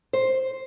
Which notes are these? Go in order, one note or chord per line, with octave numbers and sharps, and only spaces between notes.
C5